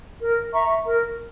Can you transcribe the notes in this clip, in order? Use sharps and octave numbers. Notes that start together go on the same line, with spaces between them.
A#4
E5 A#5 C#6
A#4